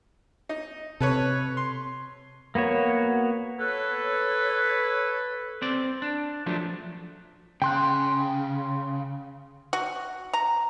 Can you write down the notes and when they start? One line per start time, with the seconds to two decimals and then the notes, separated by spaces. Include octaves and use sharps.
0.49 D#4
1.00 C3 A4 B4 C#5
1.57 C6
2.55 A#3 B3 F#4 C#5
3.58 A4 B4 C#5
5.62 C4 D5
6.02 D4
6.46 F3 F#3 A3 D4
7.62 C#3 G5 C6 F#6
9.73 F#4
10.33 A#5